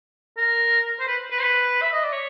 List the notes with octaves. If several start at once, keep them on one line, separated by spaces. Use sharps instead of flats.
A#4
C5
B4
B4
C5
B4
E5
D#5
D5
C#5